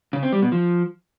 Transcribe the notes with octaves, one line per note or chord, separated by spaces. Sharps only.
C#3
C4
G3
B2
F3